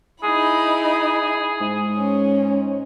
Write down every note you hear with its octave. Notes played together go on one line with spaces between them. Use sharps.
D#4 E4 G#4 B5
G#2
C#4